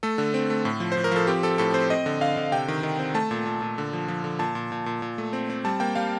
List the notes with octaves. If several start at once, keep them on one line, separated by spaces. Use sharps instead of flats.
A3 A4
D3
C4
A3
A2
F3
F3 C5
A#4
F3 A4
C4 G4
C4 A4
A2 A4
C4 C5
C4 D#5
D3
D3 F5
D3
C3 G5
D#3
D#3
C4
A3 A5
A#2
A#2
A#2
D3
F3
F3
D3
A#2 A5
A#2
A#2
A#2
A#2
A3
C4
C4
G3 A5
A#3 G5
G3 F5